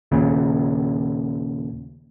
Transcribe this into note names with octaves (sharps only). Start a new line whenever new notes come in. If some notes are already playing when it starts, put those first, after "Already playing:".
D#2 A#2 C#3